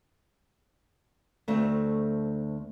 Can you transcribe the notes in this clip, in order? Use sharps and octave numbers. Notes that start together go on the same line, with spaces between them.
D2 A3 C4